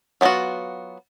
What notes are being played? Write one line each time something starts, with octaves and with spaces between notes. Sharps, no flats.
F#3 B3 D#4 F4 F#4